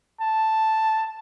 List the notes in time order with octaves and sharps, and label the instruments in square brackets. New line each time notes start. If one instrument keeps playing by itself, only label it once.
[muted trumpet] A5